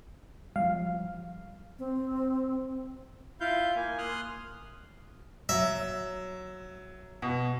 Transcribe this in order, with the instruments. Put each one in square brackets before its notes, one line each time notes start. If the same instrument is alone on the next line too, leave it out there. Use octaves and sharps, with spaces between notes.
[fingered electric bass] F3 G3 [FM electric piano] F5
[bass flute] C4
[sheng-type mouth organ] E4 F4 F5 G6
A#3 G#5
C6 D#6 F6 F#6
[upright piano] F#3 [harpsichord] E5
[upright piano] B2